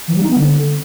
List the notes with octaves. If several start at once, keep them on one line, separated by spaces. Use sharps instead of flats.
E3
G3
D#4
B3
D3